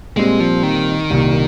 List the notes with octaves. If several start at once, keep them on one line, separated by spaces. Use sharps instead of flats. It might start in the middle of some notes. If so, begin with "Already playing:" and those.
A#2 G3 G#3 C4
F3
D#3
C2 A#2 G3